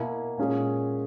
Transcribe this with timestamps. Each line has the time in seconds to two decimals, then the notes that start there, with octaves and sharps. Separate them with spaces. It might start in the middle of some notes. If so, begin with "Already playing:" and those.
Already playing: B2 A#3 E4
0.38 A#2 G#3 C#4 G#4